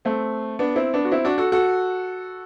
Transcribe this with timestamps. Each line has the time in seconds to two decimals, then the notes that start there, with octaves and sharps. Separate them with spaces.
0.05 A3 C4
0.59 B3 D4
0.76 C4 E4
0.94 B3 D4
1.05 F#4
1.11 C4 E4
1.25 D4 F#4
1.38 F#4 A4
1.52 F#4 A4